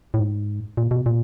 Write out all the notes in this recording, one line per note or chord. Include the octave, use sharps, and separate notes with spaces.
A2
G#2
A#2
B2
A#2